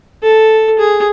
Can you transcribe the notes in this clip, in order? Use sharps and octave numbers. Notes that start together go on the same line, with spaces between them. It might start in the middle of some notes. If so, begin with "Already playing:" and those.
A4
G#4